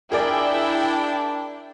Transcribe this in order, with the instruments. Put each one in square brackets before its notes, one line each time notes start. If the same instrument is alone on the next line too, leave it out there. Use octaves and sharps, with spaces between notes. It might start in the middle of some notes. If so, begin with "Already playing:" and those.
[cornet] D4 [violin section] E4 G5 [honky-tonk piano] G#4 A#4 D5